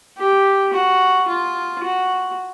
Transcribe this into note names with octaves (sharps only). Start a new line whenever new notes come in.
G4
F#4
F4
F#4